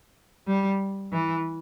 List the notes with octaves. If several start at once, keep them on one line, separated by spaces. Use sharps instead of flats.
G3
E3